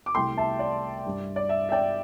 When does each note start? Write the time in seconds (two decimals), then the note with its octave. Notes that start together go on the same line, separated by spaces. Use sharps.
0.06 D6
0.15 C2 C3 A3 G5 C6
0.37 E5 A5
0.59 D5
1.05 G2 G3
1.36 D5
1.49 E5
1.69 E5
1.72 D5 G5